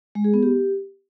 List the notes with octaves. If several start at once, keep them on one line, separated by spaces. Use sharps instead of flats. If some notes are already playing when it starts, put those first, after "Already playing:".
G#3
G#4
B3
G4